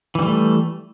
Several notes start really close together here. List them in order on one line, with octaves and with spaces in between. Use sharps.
E3 G3 A3